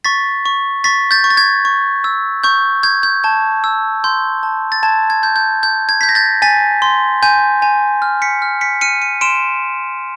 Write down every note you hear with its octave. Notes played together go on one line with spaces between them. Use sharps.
C#6 A6 B6
C#6
C#6 A6 B6
G6 A6
C#6
A6
G#6
C#6
E6
C#6 G6
G6 G#6
G6
A5 G#6
E6
C6 G6
A5
A6
A5 G#6
G#6
G6
G6
G6
G#6
G6 B6
A#6
G6 A6
G#5 A6 B6
C6
G#5 G6
G#5
F6
B6 C#7
F6
B6 C#7
F6 C#7 D#7
C#7 D#7
C6 D7 E7